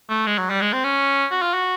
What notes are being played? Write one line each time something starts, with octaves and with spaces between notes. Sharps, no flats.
A3
G#3
F#3
G3
G#3
C4
C#4
F#4
F4
F#4